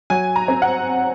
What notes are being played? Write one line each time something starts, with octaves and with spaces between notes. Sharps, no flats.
F#3 G#5
A#5
C4
F#5